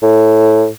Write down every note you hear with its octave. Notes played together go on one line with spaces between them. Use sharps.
A2